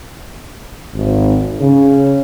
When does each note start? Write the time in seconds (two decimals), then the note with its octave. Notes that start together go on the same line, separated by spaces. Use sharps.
0.94 G#1
1.61 C#3